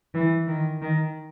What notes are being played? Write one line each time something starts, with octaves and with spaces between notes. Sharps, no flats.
E3
D#3
D#3